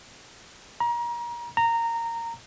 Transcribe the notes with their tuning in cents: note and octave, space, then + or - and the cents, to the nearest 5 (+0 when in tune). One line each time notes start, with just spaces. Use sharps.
A#5 +30
A#5 -15